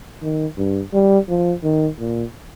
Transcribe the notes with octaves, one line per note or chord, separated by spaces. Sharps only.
D#3
G2
G3
F3
D#3
A#2